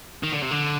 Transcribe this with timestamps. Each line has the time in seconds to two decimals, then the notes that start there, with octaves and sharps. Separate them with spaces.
0.23 D#3
0.32 D3
0.42 C3
0.51 D3